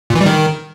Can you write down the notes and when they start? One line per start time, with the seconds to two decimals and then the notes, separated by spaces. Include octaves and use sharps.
0.10 A#2
0.15 E3
0.21 G3
0.26 D#3